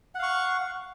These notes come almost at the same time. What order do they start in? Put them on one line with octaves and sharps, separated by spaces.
F#5 F5 C#6